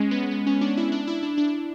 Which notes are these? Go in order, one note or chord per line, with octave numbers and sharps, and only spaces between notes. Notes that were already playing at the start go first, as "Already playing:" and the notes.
Already playing: G#3 C#4
B3
B3
C#4
D4
E4
D4
E4
D4
D4